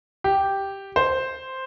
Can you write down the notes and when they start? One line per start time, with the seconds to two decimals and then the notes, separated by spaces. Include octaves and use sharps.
0.24 G4
0.96 C5